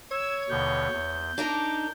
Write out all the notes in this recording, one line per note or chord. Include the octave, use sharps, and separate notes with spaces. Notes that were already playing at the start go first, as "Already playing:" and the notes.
C#5 E6 G#6
D#2 B2 D3 G6
E2
D4 D#4 A#4 D6